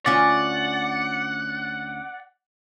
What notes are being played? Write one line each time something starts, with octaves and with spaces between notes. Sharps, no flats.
D2 C#4 F4 D5 F#5